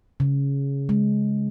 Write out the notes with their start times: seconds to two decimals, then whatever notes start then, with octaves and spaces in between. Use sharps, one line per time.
0.20 C#3
0.89 G#3